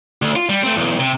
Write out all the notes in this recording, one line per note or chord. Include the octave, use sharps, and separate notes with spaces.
D2
F4
G3
A3 C4
B1 E2
C3